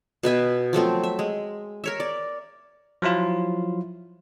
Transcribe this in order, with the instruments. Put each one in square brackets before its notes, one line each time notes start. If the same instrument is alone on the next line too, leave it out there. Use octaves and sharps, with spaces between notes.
[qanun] B2 B4 E5 G#5
F3 F#3 A3 C4
E5
G#3
A#4 C#5 E5
D5
[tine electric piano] F3 F#3 E4 F4